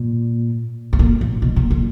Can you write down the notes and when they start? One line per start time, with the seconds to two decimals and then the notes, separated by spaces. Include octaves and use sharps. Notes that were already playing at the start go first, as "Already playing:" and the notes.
Already playing: A#2
0.93 A2
0.99 A#2
1.21 A#2
1.42 B2
1.56 A#2
1.71 A#2